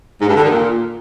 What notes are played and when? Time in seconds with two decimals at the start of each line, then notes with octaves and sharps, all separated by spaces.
0.21 G#2
0.28 G2
0.35 D3
0.42 D#3
0.50 A#2